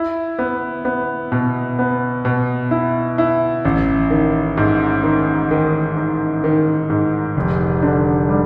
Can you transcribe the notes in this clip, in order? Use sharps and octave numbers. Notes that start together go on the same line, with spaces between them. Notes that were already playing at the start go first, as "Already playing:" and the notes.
Already playing: E4
B3
B3
B2
B3
B2
E4
E4
A1
D#3
G#2
D#3
D#3
D#3
D#3
G#2
F1
D3
G3